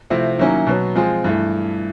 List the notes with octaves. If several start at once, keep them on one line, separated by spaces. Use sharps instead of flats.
C3 F3 A3 C4 E4
D#3 F#3 A#3 C#4 E4
B2 F#3 B3
F3 G#3 C4 F4 G#4
G2 E3 A3